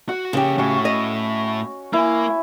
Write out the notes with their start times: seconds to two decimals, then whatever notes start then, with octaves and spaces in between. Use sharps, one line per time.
0.09 F#4 F#5
0.33 C#3 A#3 G4 C#5
0.58 A2 C#4 F#4
0.85 D#5
1.93 A#3 E4 G#5